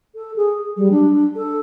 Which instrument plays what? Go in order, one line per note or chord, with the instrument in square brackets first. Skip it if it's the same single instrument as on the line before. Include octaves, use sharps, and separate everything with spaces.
[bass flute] A4
G#4
G3
D4
A4